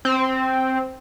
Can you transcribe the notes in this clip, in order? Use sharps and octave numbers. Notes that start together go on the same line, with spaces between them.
C4